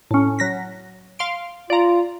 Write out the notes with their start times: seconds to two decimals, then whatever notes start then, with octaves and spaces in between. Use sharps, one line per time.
0.11 A2 C#4
0.39 F#3 A#6 B6
1.19 F5 C6 D7
1.70 F4 D5 A#5